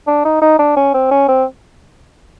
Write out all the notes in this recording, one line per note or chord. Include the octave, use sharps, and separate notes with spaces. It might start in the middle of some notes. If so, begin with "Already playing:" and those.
D4
D#4
D#4
D4
C#4
C4
C#4
C4